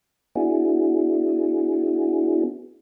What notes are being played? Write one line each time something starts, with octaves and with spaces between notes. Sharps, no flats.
B3 D4 E4 F#4 G#4